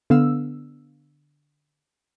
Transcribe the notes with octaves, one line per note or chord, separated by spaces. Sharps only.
D3 B3 F5 E6